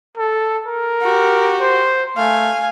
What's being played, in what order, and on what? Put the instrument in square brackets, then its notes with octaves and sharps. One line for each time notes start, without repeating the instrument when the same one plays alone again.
[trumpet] A4
A#4
[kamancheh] F#4 G4
[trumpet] C5
[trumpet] A3 [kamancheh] F5 G#5